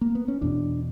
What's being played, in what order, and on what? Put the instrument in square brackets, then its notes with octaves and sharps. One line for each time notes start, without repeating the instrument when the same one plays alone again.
[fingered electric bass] A#3
B3
C#4
E2 B2 D4